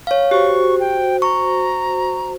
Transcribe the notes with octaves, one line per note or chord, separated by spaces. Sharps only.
C#5 F5
F#4 G4 C5 C#6
G5
A#5 C#6